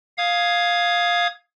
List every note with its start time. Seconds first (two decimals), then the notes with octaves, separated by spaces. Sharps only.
0.18 F5 D#6 G#6